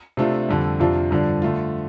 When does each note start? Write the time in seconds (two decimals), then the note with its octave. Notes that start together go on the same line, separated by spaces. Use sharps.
0.17 C3 A3 D4 F4
0.49 F2 D3 G3
0.80 F2 C3 F3 D4 F4
1.11 G2 D3 F3 D4
1.42 D3 A3 F4